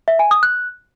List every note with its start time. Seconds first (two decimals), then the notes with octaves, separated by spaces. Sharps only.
0.08 E5
0.19 G#5
0.31 D#6
0.43 F#6